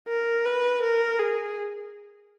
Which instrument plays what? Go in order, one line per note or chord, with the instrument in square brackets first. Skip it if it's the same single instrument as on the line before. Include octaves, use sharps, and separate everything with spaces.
[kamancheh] A#4
B4
A#4
G#4